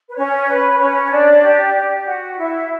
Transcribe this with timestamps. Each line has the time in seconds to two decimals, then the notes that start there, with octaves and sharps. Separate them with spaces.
0.09 B4
0.16 C#4 C#5
0.48 B4
0.79 C#4 C#5
1.11 D4 D5
1.42 G4
1.74 G4
2.05 F#4
2.37 E4 E5